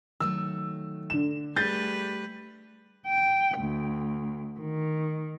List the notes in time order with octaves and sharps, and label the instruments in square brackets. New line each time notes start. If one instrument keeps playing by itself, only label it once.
[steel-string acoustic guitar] D#3 F#3 A3 [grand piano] E6
[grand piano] D3 E7
[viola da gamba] G3 A3 B4 [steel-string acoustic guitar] G#4 [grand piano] G6 A6
[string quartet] G5
D2
D#3